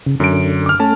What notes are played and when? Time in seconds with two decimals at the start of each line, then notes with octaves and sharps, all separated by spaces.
0.06 C#3
0.20 F#2 D3 D7
0.66 D6 F6
0.79 A3 C#4 A5